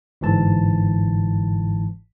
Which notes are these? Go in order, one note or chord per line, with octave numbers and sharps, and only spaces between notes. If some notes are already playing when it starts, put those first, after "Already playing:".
G1 G#2 E3 A5